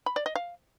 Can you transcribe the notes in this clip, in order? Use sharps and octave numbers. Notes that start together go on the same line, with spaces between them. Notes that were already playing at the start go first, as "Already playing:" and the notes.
B5
D5
D#5
F5